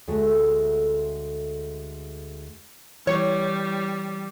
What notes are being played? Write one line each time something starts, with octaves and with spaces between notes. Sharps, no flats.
D2 G#3 A3
E3 G3 C#5